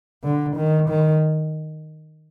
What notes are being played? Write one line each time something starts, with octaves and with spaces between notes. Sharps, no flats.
D3
D#3
D#3